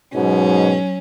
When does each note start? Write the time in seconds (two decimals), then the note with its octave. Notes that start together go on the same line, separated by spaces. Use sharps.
0.14 G#2 B2 F#3 C#4